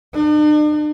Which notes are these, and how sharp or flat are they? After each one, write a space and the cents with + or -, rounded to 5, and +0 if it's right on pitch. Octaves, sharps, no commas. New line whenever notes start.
D4 +45